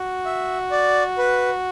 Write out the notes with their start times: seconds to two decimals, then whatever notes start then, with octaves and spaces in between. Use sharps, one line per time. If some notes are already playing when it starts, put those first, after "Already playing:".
Already playing: F#4
0.25 E5
0.71 D5
1.18 B4